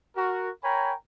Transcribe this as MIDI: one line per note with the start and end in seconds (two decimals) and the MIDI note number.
0.16 0.50 66
0.16 0.50 70
0.63 0.94 70
0.63 0.94 73
0.63 0.94 79
0.63 0.94 80
0.63 0.94 82
0.63 0.94 83